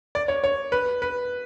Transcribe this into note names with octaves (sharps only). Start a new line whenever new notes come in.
D5
C#5
C#5
B4
B4